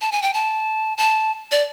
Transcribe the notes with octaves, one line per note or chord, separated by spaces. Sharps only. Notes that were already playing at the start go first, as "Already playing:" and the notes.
A5
G#5
G5
A5
A5
D5